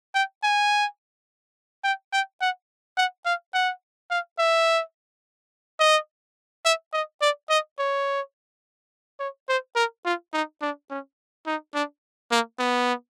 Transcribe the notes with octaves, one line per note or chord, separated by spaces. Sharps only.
G5
G#5
G5
G5
F#5
F#5
F5
F#5
F5
E5
D#5
E5
D#5
D5
D#5
C#5
C#5
C5
A#4
F4
D#4
D4
C#4
D#4
D4
A#3
B3